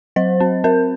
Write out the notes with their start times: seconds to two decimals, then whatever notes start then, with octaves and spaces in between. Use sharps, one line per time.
0.16 F#3 C5
0.40 C4
0.64 C4 A#4